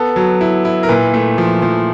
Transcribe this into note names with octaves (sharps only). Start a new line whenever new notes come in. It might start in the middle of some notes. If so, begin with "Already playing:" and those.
Already playing: B3 A4
F#3
E4
E4
A#4
A#2 B4
A3
F3
F3